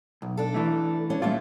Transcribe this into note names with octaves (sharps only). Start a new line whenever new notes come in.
B1
D4 A4
E3 A3
C#4 D4
A#2 G3 A3 F4 E5